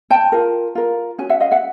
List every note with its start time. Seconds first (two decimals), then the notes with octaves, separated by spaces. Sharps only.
0.10 G5 A5
0.32 F4 A#4
0.75 F4 A#4
1.18 C#4 F#4 G#5
1.29 E5 F#5
1.40 D#5 F5
1.51 E5 F#5